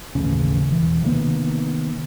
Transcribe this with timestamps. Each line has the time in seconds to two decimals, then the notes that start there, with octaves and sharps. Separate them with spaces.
0.15 A1 D#2 C#3
0.69 E1 E3
1.04 C3 D#3 A#3 B3